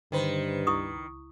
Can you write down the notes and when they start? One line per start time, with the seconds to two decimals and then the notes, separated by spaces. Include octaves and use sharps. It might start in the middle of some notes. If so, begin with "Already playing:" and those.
0.12 G2 D3 D#3 B4 C5
0.67 C#2 E4 C#6 D#6